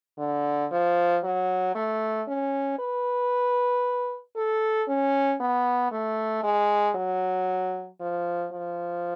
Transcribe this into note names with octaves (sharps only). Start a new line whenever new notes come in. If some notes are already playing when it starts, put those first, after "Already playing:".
D3
F3
F#3
A3
C#4
B4
A4
C#4
B3
A3
G#3
F#3
F3
F3